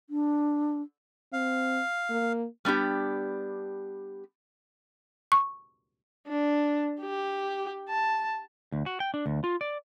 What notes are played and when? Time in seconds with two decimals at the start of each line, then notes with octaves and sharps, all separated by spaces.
0.10 D4
1.33 C4 F5
2.10 A#3
2.65 G3 B3 D4 G4
5.32 C#6
6.27 D4
7.01 G4
7.89 A5
8.72 D2
8.86 F#4
9.00 G5
9.14 D4
9.26 D2
9.44 F4
9.61 D5